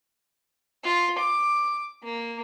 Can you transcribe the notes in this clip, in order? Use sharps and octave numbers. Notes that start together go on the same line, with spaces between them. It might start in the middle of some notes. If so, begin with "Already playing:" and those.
F4
D6
A#3